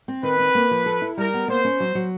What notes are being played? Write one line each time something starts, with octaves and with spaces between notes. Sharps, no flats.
C4
D#3 B4
C4
A#3
F3
A4
E4
G3 A#4
B3
A#3 C5
C#4
F#3
F#3